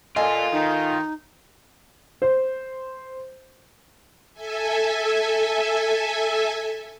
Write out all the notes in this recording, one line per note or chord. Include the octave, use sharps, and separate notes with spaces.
A#2 F4 A4 D#5 G#5
D#3 D#4
C5
A4 E5 G#5